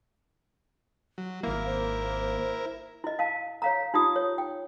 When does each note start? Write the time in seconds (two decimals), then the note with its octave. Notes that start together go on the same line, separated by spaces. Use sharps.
1.18 F#3
1.43 G#1 A#3 E4 A#4 F5
1.66 C5
3.04 E4 D#5
3.19 F5 A5
3.62 C#5 F5 A#5
3.94 D#4 F4 G4 D#6
4.16 C#5
4.38 G5